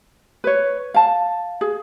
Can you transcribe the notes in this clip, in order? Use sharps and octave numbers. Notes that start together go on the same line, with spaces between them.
B4 C#5
F5 A5
G#4